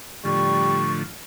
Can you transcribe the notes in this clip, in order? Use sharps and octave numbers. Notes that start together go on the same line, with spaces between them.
A2 D3 F3 G3 C#6